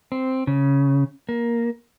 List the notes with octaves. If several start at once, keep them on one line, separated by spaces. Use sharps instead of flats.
C4
C#3
A#3